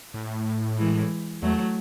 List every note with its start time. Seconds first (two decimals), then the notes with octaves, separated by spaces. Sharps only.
0.14 A2
0.78 E3 G#3
1.42 E2 F#3 A3